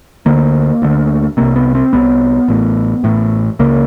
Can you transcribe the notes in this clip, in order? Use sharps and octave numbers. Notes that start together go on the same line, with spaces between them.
D2 D3 A#3
D2 D3
C2 C3 A#3
B3
C4
C2 C3 B3
A1 A2
A1 A2
C#2 C#3 A#3